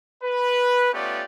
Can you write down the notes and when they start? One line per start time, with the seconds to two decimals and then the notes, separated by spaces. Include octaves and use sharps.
0.23 B4
0.93 A3 B3 C#4 F4 G4 D5